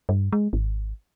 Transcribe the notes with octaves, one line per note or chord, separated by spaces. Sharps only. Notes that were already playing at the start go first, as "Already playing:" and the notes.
G2
G#3
G#1